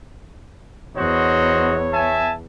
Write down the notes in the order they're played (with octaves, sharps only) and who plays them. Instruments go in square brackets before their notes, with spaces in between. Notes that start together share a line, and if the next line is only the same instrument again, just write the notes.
[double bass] E2 [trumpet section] F#4 C5 D#5 [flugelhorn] C#5
[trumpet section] E5 G#5 A5